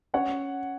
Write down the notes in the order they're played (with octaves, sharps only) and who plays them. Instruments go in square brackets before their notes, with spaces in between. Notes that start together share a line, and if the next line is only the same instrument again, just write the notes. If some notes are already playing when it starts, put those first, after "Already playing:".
[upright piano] C#4 C#5 F#5